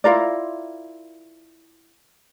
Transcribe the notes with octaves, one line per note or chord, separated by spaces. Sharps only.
E4 F4 A#4 D5